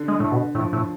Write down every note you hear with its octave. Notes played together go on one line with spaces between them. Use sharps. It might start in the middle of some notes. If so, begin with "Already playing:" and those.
Already playing: D3
G#3
A2
B2
A2 F3
A2